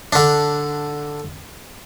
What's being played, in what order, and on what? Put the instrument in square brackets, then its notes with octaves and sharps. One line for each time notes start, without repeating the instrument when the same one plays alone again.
[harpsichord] D3 D4